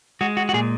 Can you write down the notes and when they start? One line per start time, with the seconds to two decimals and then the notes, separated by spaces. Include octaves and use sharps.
0.21 G#3 F#4
0.37 F#4
0.49 F#4
0.54 A#2 G#4